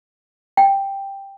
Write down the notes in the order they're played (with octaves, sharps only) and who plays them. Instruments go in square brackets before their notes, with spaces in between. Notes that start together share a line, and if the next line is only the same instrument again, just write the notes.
[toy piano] G5